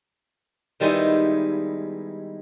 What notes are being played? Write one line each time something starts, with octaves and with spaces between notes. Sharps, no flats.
D#3 G3 G#3 B3 D#4 E4